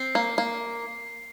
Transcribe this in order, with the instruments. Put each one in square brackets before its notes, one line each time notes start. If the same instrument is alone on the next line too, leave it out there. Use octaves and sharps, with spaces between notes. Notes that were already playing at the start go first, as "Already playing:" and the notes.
Already playing: [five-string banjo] C4 [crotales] C7
[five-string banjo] A#3
A#3